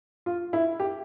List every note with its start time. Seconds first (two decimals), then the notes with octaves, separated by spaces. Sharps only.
0.26 F4
0.53 E4
0.80 G4